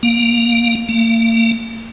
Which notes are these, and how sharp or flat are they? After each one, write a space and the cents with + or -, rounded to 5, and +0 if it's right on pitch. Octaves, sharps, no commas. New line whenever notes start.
A#3 +10
A#3 -40